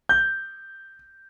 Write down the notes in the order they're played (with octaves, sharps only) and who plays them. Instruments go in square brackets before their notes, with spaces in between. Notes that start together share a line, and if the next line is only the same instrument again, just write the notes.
[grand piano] G6